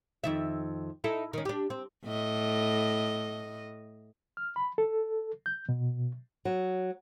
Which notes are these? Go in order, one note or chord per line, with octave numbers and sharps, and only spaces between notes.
F2 D#3 E5
D#4 E4 A4
D#3 C#4
D4 G4
C4
A2 D#5
F6
B5
A4
G6
B2
F#3